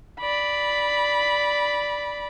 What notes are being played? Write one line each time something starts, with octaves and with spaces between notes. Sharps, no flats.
D5 B5